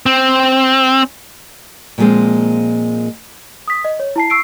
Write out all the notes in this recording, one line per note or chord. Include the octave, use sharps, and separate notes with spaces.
C4
A#2 F3 G3 G#3 A#3 C4
D#6 B6
D#5
C#5
E4 A5 C7
C#6 E6 C7 D7